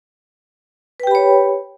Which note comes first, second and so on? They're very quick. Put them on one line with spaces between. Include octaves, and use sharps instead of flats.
B4 G5 G4 B5 C#5